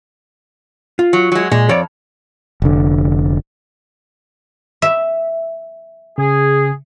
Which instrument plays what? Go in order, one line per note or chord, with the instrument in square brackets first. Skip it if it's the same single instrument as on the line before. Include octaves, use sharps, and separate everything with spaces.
[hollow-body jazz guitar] F4
[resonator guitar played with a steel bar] F#3
F#3 G#3
[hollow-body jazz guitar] A#2 [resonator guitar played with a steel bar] G#3
[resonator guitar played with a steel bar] F2 [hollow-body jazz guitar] C#5 D5
[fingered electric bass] F1 D3
[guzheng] E5
[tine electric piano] C#3 [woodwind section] G#4